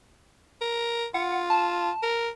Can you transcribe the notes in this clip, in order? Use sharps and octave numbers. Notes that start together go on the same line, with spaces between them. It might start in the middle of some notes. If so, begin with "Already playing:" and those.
A#4
F4 F#5
A5
A#4